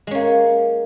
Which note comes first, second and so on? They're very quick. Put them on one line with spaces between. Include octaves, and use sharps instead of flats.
G#3 C#4 A#3